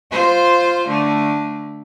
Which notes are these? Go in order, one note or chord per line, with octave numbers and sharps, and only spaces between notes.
F4 C5
D3 A3